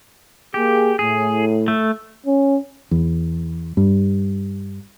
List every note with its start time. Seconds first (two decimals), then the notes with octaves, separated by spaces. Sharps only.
0.54 A#3 G4 G#4
0.99 A2 G#4
1.68 A3
2.26 C#4
2.91 E2
3.77 G2